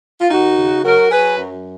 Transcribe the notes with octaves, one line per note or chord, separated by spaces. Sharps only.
F4
D#2 D#4 F#4
C#3
F#3 F#4 A#4
F#3 G#4 B4
F#2